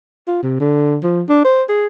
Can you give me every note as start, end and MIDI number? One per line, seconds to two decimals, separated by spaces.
0.27 0.42 65
0.43 0.59 48
0.60 0.98 50
1.03 1.23 53
1.29 1.40 62
1.44 1.63 72
1.69 1.87 68